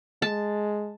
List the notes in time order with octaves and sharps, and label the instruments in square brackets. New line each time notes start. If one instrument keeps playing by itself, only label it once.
[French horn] G#3 [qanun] A5